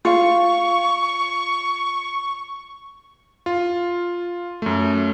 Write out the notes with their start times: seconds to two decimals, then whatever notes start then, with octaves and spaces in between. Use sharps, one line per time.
0.05 F4 F5 C#6
3.46 F4
4.62 F#2 A3